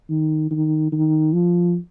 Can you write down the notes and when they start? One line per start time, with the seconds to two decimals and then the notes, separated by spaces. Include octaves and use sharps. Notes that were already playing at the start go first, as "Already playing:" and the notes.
0.09 D#3
0.51 D#3
0.92 D#3
1.33 F3